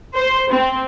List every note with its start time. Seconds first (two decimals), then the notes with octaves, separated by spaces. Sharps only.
0.14 C5
0.49 C4